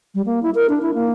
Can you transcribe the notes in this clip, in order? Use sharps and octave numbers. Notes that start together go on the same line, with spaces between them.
G3
A#3
E4
A#4
D4
E4
A#3